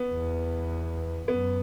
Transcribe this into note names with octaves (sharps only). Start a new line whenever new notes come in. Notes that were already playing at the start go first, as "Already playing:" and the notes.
Already playing: B3
E2
F#2 B3